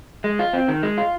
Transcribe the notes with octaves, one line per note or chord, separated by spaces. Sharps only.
G#3
F4
C4
D#3
G#3
F4